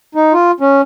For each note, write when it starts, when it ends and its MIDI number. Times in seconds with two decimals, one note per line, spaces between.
0.15 0.33 63
0.33 0.51 65
0.60 0.81 61